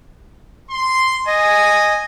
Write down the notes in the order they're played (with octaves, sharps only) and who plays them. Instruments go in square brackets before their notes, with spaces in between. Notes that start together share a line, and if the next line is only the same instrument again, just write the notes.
[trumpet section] C6
[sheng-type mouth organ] D#5 [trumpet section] G#5